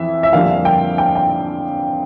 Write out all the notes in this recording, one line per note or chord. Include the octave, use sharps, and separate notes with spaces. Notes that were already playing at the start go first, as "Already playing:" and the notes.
Already playing: F2 E3 E4 E5
E5
F2 D3 G3 A#3 D4 F5
G5
G5
G5